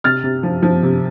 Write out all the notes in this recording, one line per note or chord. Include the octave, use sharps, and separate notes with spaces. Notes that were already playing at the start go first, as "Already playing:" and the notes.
C3 F6 A6
C3
F3
F3
C3